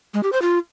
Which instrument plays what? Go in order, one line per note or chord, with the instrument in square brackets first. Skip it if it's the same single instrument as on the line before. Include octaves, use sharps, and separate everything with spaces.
[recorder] G#3
G4
C5
F4